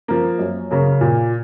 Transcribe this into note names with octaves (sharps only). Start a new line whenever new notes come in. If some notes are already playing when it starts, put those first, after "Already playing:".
F3 A#3
F#2
C#3 F#3 A#3 C#4
A#2